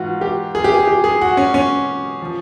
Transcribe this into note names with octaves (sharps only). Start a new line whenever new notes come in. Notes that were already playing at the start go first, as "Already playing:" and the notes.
Already playing: G#2 E3 F4 F#4
G4
G#4
G4
G#4
G4
G#4
F#4
C#4
C#4
F3